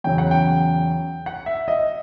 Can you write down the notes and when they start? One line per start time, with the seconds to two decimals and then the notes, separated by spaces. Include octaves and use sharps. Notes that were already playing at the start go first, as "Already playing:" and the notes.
0.04 E2 C#3 F#3 G5
0.18 F#5
0.31 G5
1.26 F#5
1.46 E5
1.68 D#5